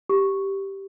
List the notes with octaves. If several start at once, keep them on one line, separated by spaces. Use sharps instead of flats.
G4